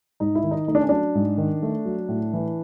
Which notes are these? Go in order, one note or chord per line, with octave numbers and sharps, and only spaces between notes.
G#2 D#4
E4
D#3
D#4
A3 D#4
D4
C#4
F#3 D4
G#2
D#3
A3
F#3
A2
E3